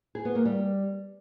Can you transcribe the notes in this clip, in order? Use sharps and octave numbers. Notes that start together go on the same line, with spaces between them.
G#4
B3
A#3
G3